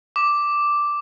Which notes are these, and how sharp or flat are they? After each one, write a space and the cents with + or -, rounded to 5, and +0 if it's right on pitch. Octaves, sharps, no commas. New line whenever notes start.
D6 +0